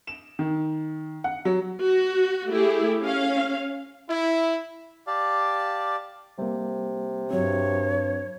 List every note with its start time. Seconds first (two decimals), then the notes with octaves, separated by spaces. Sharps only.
0.07 E7
0.39 D#3
1.24 F#5
1.45 F#3
1.81 F#4
2.50 A3 E4 G4 G#4
3.02 C#4 F5
4.08 E4
5.07 G4 D5 F5 A5
6.38 C3 G3 A#3
7.31 G2 F#3 C4 C#5